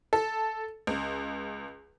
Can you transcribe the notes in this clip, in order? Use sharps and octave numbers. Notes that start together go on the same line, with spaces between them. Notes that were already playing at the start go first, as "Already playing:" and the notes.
A4
C#2